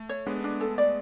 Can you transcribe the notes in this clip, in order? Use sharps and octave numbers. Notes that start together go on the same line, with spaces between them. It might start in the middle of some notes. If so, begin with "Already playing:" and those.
Already playing: A3
C#5
G#3 B3 D4
D4
A4
D5